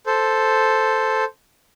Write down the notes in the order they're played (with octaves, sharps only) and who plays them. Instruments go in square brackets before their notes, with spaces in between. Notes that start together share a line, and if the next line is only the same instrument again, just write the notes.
[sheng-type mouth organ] A4 C5